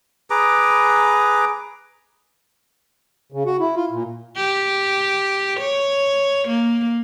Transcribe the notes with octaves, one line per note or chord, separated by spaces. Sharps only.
G#4 B4 A#5 D6
C#3
F#4
E4
F4
A#2
G4
C#5
A#3